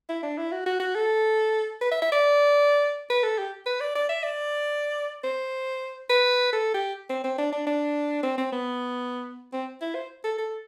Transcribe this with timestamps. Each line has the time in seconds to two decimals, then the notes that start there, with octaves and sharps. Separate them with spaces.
0.09 E4
0.23 D4
0.38 E4
0.52 F#4
0.66 F#4
0.80 F#4
0.95 A4
1.81 B4
1.92 E5
2.02 E5
2.12 D5
3.10 B4
3.24 A4
3.38 G4
3.66 B4
3.81 D5
3.95 D5
4.09 E5
4.23 D5
5.24 C5
6.10 B4
6.53 A4
6.74 G4
7.10 C4
7.24 C4
7.38 D4
7.52 D4
7.67 D4
8.23 C4
8.38 C4
8.52 B3
9.53 C4
9.81 E4
9.95 C5
10.24 A4
10.38 A4